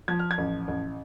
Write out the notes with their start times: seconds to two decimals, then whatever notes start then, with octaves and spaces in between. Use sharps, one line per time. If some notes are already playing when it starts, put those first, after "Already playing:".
0.08 F3 G#6
0.19 F6
0.31 G#6
0.38 A1
0.68 A1